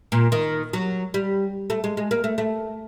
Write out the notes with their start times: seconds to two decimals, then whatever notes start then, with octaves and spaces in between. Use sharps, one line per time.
0.12 A#2
0.32 D#3
0.73 F#3
1.14 G3
1.70 A3
1.84 G#3
1.97 G#3
2.11 A#3
2.24 A3
2.38 A3